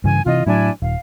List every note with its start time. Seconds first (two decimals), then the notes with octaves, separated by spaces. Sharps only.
0.04 G2 C#3 E3 G#5
0.26 C3 E3 F4 D#5
0.46 A2 F#3 D4 E4 G#5
0.82 D#1 F5